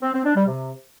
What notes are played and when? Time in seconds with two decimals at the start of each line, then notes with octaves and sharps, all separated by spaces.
0.02 C4
0.13 C4
0.24 D4
0.35 G3
0.46 C3